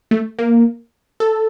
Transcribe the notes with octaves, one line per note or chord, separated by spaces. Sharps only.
A3
A#3
A4